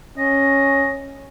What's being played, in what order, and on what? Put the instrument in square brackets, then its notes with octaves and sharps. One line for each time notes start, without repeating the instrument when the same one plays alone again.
[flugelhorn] C#4 [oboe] D#5